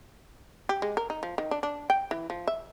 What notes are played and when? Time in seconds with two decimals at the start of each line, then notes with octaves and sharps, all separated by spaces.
0.69 G4
0.82 G#3
0.97 A#4
1.10 D#4
1.23 F3
1.38 D#3
1.51 D4
1.63 D4
1.90 G5
2.11 E3
2.30 F3
2.47 E5